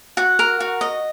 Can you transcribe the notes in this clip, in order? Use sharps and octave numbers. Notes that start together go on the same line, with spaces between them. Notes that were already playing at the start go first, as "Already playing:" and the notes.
F#4 F#5
A#4
F#4
D#5